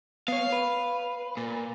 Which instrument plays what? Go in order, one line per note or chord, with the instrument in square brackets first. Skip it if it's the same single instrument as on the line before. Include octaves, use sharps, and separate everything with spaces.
[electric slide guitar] B3 C#5 [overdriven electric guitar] F5
[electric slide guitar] B4
[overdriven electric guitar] A#2